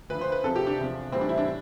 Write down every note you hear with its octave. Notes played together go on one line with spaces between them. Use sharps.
D2 D3 F3 B4
C5
B4
C2 C3 F3 A4
G4
D4
E2 C3 F3
A2 E3 G3 C4
D4
E4
D4